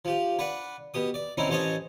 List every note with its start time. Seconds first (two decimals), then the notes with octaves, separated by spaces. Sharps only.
0.05 F3 G4
0.39 D4 B4 F#5
0.94 B2 G4 D#6
1.14 D5
1.37 C4 C#4 D#4 E4
1.49 A1 C#4 C5 C#5 D#5 A5